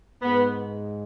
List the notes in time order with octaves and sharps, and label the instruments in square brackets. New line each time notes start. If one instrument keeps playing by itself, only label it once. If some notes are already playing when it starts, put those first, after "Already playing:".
[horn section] G#2 G#3 B3